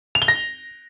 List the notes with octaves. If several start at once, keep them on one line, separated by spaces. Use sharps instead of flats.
F7
G7
A#6